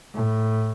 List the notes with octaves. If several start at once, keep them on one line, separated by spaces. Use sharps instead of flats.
A2